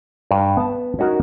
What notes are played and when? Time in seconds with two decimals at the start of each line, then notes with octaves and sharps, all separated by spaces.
0.31 G2
0.57 B3 A5
0.99 C#4 D#4 F#4 A#4